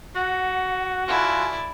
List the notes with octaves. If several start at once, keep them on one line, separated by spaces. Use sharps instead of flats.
F#4 F#5
E4 F4 A4 D5 G#5